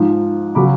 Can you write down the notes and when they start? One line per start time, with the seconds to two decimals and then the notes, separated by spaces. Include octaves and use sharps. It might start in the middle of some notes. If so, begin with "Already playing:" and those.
Already playing: G#2 F3
0.55 C#3 F#3 B5 D6